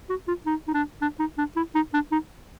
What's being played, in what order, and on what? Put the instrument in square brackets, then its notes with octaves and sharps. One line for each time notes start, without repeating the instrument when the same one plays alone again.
[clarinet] F#4
F4
D#4
D#4
D4
D4
D#4
D4
E4
D#4
D4
D#4